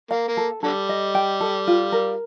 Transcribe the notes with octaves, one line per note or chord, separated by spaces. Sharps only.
A#3 F5
A#3
A4
D3 G3 A4
D#5
G5
A4
F4
A#4